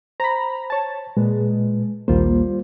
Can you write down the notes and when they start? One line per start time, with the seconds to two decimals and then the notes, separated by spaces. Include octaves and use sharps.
0.20 C5 A#5 B5
0.70 C#5 A5
1.17 A#2 G#3 B4
2.08 A#1 D#2 G3 A#3 F4 C5